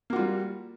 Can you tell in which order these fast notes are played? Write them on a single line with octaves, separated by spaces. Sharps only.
A#3 F#4 F4 G3